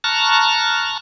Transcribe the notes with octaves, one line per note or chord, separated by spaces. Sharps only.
A5 A#5 C#6 F6 F#6